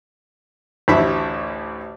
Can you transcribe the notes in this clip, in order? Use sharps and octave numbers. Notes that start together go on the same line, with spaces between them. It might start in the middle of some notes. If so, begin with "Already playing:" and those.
A1 D2 E4 E5